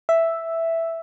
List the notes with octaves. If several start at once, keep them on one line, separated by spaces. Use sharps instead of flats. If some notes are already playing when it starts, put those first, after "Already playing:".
E5